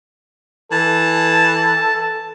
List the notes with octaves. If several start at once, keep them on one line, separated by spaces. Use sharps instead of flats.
E3 A4 A5